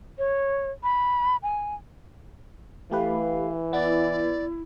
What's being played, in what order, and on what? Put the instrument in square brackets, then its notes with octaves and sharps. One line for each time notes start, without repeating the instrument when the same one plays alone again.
[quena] C#5
B5
G#5
[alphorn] E3 [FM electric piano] A3 G4 B4 [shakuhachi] F5
[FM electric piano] B3 [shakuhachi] E4 [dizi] D5